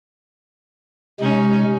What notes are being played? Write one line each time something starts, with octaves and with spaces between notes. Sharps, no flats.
C3 G#3 C#4 D#4